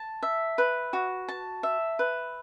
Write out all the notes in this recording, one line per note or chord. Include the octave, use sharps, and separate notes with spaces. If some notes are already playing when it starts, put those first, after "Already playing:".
Already playing: A5
E5
B4
F#4
A5
E5
B4